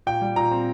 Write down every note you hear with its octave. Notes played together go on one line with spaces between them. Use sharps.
A#2 G5
G3
A#2 A#5
C4